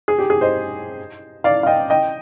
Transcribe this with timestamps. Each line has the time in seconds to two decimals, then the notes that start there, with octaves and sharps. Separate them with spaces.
0.08 G#4
0.18 G4
0.30 G#4
0.41 C5 D#5
1.44 D5 F5
1.63 F5
1.67 D#5 G5
1.90 D#5 G5